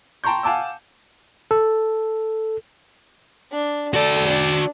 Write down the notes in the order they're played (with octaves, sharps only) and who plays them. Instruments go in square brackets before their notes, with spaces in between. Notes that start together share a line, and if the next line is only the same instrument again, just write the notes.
[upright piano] G5 A5 A#5 C6 C#6 G6
F5 F#5 G#5 A5 D6 E6
[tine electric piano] A4
[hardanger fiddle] D4
[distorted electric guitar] F#4 D5 [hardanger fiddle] A4
[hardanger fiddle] D4